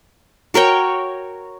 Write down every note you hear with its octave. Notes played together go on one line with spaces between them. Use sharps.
F#4 A#4 C#5 G5